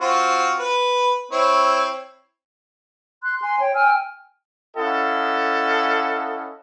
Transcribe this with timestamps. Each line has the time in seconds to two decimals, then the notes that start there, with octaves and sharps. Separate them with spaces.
0.01 C4 F4 F#4
0.59 B4
1.32 C4 E4 C#5
3.24 C6 F#6
3.40 G#5 C6
3.59 C#5 G5
3.74 G5 G#5 E6 F6
4.77 C#4 E4 A4 D#5 F5 F#5